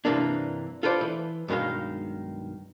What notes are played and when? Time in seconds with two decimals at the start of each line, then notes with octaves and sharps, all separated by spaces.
0.05 G2 C3 E3 A#3 D4
0.83 F4 A4 B4 C5 D5
1.01 E3
1.48 B1 G2 D#3 G#3 F5